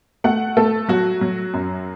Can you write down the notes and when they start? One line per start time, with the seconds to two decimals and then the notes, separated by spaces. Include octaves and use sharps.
0.24 A3 F#5
0.57 A3 A4
0.89 F#3 F#4
1.21 F#3
1.54 F#2